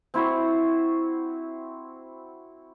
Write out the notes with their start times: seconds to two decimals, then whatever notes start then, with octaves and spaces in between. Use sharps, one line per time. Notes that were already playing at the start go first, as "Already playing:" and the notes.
0.14 C4 E4 F#4 C5